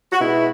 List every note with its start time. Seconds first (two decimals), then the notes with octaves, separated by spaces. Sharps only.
0.12 F#4
0.20 B2 G#3 B3 E4